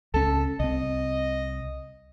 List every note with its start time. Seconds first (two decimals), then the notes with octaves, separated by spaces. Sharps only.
0.14 C#2 C#4 A4
0.60 C2 C4 D#5